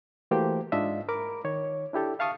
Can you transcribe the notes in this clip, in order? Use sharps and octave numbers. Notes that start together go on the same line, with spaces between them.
E3 A3 A#3 F#4 G4 C5
G#2 D4 F4 D#5 E5
A#4 B5 D6
D#3 C#5
D4 E4 G4 A4
E5 F5 A5 C#6 D#6 F6